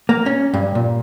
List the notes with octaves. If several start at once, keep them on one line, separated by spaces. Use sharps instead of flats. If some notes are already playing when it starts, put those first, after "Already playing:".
A#3
C#4
G2
A#2